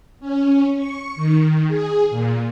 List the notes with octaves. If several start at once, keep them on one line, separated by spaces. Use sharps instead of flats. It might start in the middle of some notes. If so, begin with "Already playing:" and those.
C#4
C#6
D#3
G#4
A#2